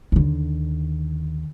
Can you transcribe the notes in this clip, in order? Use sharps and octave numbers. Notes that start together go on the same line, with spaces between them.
D#2 D3